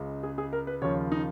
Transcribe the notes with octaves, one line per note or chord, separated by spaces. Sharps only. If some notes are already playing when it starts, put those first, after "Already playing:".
Already playing: C#2 C#3 G#3
G#4
G#4
A#4
B4
D#2 C#3 F3 C#5
D#4